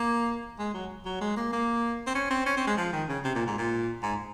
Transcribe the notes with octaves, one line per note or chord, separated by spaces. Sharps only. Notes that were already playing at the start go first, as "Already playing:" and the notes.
Already playing: A#3
G#3
F#3
F#3
G#3
A#3
A#3
C4
C#4
C4
C#4
C4
G#3
F3
D#3
C#3
C3
A#2
G#2
A#2
G#2